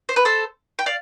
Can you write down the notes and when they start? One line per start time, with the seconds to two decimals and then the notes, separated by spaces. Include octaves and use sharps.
0.09 C5
0.16 B4
0.25 A4 C5
0.79 G5
0.86 D5 F5